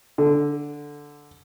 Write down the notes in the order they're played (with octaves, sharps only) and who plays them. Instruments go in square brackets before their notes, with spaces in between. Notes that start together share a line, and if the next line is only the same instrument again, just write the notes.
[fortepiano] D3